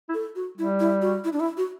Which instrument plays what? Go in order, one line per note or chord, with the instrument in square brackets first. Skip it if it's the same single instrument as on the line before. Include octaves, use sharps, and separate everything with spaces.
[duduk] E4
[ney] A4
F#4
[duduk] G3 [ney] E4
[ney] E4
F#4
E4
D4
E4
F#4